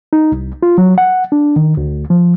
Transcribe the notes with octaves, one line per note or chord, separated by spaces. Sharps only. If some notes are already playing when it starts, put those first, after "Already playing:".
D#4
C2
F4
F#3
F#5
D4
D#3
D2
F3